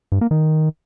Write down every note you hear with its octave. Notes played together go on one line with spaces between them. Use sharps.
G2
A#3
D#3